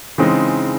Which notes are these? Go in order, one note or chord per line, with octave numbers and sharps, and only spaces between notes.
C#3 E3 G#3 C4 D#4